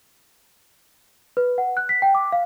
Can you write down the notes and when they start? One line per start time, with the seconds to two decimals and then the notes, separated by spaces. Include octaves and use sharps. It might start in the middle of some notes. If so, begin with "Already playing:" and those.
1.37 B4
1.58 F#5
1.77 F#6
1.89 B6
2.02 G5
2.15 D6
2.32 F5